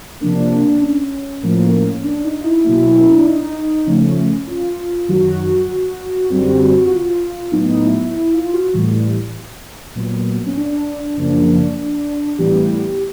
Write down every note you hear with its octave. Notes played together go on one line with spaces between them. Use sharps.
C3 F3 A#3 D4
C#4
A2 F3 A#3
D4
D#4
F4
E4
B2 F#3 A#3 E4
C#4
D4
D#4
C#3 F3 A3 C#4
F4
F#2 D#3 F#3 F#4
F#2 D3 G3 C4 F#4
F#4
F4
A2 F#3 B3 D#4
E4
E4
F4
F#4
A2 E3 G3
A#2 F#3 B3
C#4
D4
F#2 C#3 F3 A#3
A2 E3 G3 B3 G4